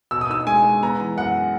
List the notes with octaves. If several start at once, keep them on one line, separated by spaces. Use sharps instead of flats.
B2 E6
D#6
D#4 E6
G#3 G#5
G#3
B3 A#5
E3
F#2 F#5